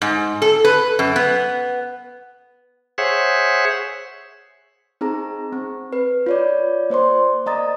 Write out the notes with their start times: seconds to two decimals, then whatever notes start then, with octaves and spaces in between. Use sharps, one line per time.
0.02 G#2
0.42 A4
0.65 B4
0.99 F#2
1.16 B3
2.98 G#4 C5 C#5 E5 F#5
5.01 C4 D#4 G#4 A#5
5.53 C4
5.93 B4
6.26 F4 C#5 D5
6.90 A#3 C5 D5 C6
7.46 A#3 D5 D#5 A#5 D#6 A6